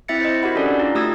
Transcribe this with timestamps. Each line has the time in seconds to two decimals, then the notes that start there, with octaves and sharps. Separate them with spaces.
0.08 C4 E4 E5 A6 C#7
0.21 C5 D#5
0.43 F#4 G4 A#4 F#5 B5
0.55 C#4 D4 A4 D5
0.79 D#4 F4
0.95 A3 G4 D#6 E6 G#6